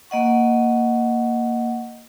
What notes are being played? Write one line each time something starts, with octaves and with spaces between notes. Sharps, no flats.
A#3 D#5 F#5 C#6